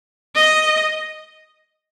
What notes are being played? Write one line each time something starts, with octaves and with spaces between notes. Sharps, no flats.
D#5